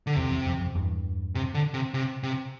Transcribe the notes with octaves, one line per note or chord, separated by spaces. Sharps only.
D3
E2 C3
E2
F2
F2
E2 G2
C3
D3
C3
C3
C3